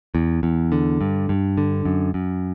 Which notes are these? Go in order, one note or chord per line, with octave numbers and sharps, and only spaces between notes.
E2
E2
D3
G2
G2
D3
F#2
F#2